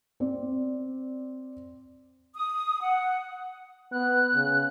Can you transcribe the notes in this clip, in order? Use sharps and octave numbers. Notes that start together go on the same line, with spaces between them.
C4 D5
D#6
F#5
B3 F#6
C#3